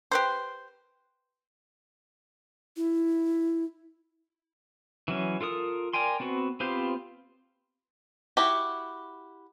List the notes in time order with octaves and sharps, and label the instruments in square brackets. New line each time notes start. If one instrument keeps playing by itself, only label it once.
[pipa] G4 B4 C5
[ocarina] E4
[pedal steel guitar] E3 F#3 C#4
F4 A4 A#4 D#6
A#4 D5 G5 G#5 C6
B3 C4 F#4
B3 C4 F4 G4 C5
[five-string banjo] E4 F#4 G4